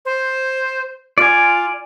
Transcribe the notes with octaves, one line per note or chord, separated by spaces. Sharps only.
C5
F4 D5 G#5